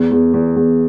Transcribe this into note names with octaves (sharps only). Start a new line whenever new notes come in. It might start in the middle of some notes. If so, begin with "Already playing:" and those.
Already playing: E2
E2
E2
E2